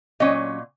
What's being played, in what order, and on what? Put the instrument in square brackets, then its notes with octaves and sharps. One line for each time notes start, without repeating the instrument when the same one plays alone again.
[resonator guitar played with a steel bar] A#2 F#3 C#4 D#5